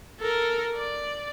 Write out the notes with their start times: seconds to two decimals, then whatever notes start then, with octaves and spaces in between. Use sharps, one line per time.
0.20 A4 A#4
0.75 D5